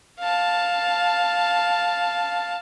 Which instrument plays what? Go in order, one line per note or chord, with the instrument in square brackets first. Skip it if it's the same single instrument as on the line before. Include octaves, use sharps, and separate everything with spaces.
[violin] F5 A5